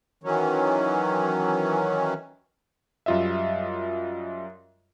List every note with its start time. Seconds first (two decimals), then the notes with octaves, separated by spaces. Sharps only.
0.24 D#3 E3 F#3 C#4
3.06 F#2 G3 F4 D#5 E5